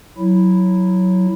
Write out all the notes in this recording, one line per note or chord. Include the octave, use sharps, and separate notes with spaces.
F#3 E4